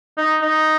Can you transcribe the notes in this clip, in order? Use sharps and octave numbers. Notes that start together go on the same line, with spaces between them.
D#4
D#4